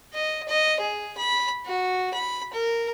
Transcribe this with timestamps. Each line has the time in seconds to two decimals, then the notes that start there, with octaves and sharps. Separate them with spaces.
0.14 D#5
0.48 D#5
0.80 G#4
1.17 B5
1.66 F#4
2.14 B5
2.53 A#4